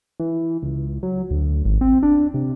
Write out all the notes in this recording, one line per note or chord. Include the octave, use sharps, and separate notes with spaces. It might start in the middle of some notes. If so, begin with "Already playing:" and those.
E3
C#2
F#3
D2
G#1
C4
D4
C3